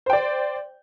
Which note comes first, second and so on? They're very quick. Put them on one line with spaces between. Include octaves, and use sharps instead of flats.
C5 G5 D5